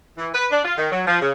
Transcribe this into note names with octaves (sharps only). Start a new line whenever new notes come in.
E3
B4
D4
F4
D#3
F#3
F3
C#3